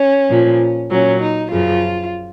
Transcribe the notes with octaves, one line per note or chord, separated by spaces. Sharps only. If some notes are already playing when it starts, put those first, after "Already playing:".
Already playing: C#4
A#2 F3
A#2 F#3 C#4
D#4
F#2 C#3 F3 F4